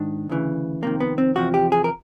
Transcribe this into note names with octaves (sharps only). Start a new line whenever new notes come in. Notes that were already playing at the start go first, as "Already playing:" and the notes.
Already playing: G#2 D#3 D4
D2 C#3 E3
F2 C3 D#3 A#3
B3
C4
E2 C3 F3 F#4
G4
G#4
A#4